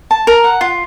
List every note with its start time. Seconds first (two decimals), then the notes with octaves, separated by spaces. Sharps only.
0.11 A5
0.27 A#4
0.44 F#5
0.61 F4